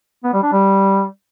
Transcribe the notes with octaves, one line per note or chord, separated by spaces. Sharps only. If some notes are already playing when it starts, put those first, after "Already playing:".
B3
G3
D4
G3